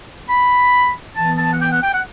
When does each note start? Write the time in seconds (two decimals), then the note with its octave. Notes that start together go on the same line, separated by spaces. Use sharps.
0.28 B5
1.16 E3 B3 A5
1.38 A5
1.53 F#5
1.60 G5
1.72 F#5
1.83 G5
1.93 F#5